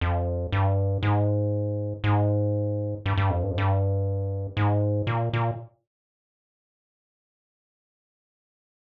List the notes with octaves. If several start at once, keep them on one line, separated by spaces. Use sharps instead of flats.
F2
G2
G#2
G#2
G2
G2
F2
G2
F2
G2
G#2
A#2
A#2